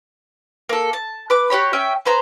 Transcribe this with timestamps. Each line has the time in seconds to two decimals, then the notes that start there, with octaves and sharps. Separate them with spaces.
0.69 A#3 A4
0.93 A5
1.30 B4 D6
1.50 F#4 G4 C#5 B5
1.73 C#4 E5 G5
2.05 G#4 B4 C5 A#5